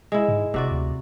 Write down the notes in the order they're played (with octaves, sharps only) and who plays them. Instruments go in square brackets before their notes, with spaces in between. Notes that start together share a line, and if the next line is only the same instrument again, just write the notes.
[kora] G#3 E4
[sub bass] G#2
[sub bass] F1 [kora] C3 F#4 D5
[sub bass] D2